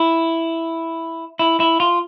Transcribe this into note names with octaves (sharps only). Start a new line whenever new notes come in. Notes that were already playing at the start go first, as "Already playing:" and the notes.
Already playing: E4
E4
E4
F4